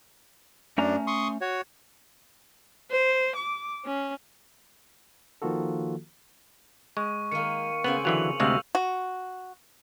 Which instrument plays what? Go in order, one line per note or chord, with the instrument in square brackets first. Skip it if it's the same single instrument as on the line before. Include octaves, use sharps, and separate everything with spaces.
[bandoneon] F#2 D4 [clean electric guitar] A3 C#4 A#5
[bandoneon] C6 C#6 D#6
F#4 C#5
[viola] C5
D6
C#4
[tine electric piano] D#3 F3 A#3 F4 F#4 A4
[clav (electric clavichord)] G#3 [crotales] C#6
[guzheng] D#3 A#3 [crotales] C#7 D#7
[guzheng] C#3 C4 G#5 [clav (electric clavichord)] B3 [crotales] F#7
[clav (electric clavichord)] D3 E3 F#3 [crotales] F7
[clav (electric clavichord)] D2 C3 G#3 [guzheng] F5 [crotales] C#6 E6 G6
[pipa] F#4